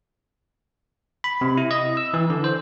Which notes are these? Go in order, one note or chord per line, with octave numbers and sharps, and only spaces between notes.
B5
C3
E4
D#5
E6
E3
D3
C5